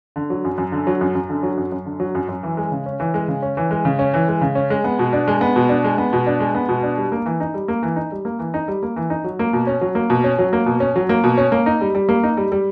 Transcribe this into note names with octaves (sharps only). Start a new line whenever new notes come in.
D3
F#3
F#2
F#2
D3
F#3
F#2
F#2
D3
F#3
F#2
F#2
D3
F#3
F#2
F#2
E3
G#3
C#3
C#4
E3
G#3
C#3
C#4
E3
G#3
C#3
C#4
E3
G#3
C#3
C#4
G#3
B3
B2
D4
G#3
B3
B2
D4
G#3
B3
B2
D4
G#3
B3
B2
D4
G3
A#3
E3
D#4
G3
A#3
E3
D#4
G3
A#3
E3
D#4
G3
A#3
E3
D#4
F#3
A#3
B2
C#4
F#3
A#3
B2
C#4
F#3
A#3
B2
C#4
F#3
A#3
B2
C#4
A#3
D#4
G3
G3
A#3
D#4
G3
G3